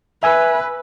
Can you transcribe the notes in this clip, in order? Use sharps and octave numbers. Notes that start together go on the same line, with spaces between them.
B4 E5 G#5 E6